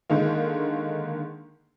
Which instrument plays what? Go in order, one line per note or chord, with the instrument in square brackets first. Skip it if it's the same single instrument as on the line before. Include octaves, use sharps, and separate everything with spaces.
[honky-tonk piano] D3 D#3 G#3 A#3